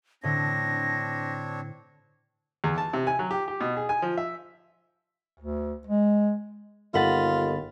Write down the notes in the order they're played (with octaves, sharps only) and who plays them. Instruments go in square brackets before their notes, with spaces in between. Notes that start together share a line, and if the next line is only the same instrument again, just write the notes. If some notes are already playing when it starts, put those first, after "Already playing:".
[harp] A2 D3 [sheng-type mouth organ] C4 D4 C#5 [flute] A#6
[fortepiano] E2
A5
C3
G#5
F#3
G4
G4
B2
G#4
G#5
F3
E5
[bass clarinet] D2
G#3
[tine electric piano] G1 B5 A6 [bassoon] D#2 [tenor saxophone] F4 [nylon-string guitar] A4 D#5 F#5